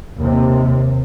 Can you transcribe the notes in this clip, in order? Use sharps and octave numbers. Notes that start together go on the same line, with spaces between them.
D#2 C3